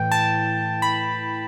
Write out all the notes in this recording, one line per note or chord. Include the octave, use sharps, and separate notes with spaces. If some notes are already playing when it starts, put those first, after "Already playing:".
Already playing: A2 E3 G5
A5
B5